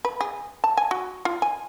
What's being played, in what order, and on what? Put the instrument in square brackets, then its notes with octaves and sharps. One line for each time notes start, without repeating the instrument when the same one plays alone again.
[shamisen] B4
G#4
A5
G#5
F#4
F4
G#5